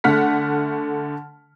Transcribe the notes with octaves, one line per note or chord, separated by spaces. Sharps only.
D3 A3 F#5 F6 B6